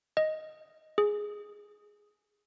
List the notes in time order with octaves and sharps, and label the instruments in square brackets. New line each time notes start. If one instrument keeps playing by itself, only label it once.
[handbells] D#5
G#4